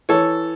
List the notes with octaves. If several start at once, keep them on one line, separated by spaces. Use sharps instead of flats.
E3 A4 C#5